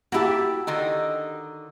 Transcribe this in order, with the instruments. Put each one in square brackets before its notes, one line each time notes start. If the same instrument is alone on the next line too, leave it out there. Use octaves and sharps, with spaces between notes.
[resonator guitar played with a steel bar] A#3 E4 A5 [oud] F#4 G4
[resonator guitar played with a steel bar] D3 D#3 D#4